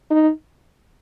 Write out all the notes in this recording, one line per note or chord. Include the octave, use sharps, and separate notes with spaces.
D#4